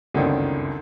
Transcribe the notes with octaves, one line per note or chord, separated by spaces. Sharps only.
G1 C#2 F#2 D3 D#3 C4